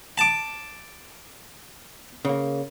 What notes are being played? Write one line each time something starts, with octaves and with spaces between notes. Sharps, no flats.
A5 D6
C#3 A#3